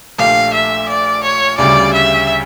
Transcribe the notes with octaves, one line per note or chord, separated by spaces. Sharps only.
A#1 A#2 A3 D4 G4 F5
E5
D5
C#5
D2 C#3 G3 D5
E5